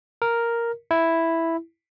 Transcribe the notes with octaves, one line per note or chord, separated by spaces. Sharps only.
A#4
E4